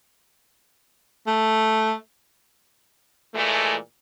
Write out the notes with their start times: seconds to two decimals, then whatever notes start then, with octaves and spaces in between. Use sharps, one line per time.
1.27 A3
3.34 A#2 E3 G#3 A3